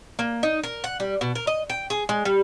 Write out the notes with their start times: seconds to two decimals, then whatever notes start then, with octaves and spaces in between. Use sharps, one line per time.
0.19 A#3
0.43 D#4
0.63 A#4
0.84 F#5
1.00 G3
1.21 B2
1.35 A#4
1.47 D#5
1.70 G5
1.90 G#4
2.09 G#3
2.25 G3